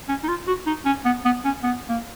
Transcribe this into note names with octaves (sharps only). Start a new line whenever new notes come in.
C#4
D#4
F4
F#4
D#4
C#4
B3
B3
C#4
B3
A#3